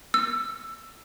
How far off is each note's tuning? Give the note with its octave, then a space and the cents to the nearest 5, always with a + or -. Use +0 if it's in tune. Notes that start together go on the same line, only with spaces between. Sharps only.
E6 +15